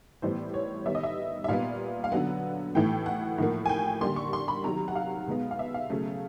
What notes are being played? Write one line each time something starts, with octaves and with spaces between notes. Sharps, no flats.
A2 E3 G3 B3 C5
C#5
D#3 G3 B3 E5
D#5
E5
E5
A#2 G3 B3 F5
F5
D3 F#3 B3 F#5
A2 E3 A3 G5
F#5
A2 F3 A#3
G#5
G5
D3 G3 A#3 C6
C#6
C6
B5
C3 D#3 F#3 A#5
F#5
F5
B2 G#3 B3
F5
E5
F5
C#3 F#3 A3